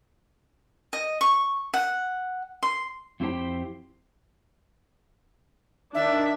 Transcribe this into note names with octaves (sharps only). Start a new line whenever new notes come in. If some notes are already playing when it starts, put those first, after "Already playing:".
D#5
C#6
F#5
C6
F2 C4 E4 G4 C5 G5
D#3 D4 E5